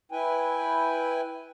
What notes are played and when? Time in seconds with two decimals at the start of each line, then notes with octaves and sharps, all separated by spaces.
0.12 E4 B4 G5 G#5